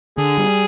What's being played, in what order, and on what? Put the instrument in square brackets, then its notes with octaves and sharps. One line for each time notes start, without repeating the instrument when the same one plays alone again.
[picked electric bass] D3 [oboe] G#4
[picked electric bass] G3